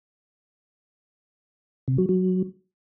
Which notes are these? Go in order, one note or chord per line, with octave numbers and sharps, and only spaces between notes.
C3
F#3
F#3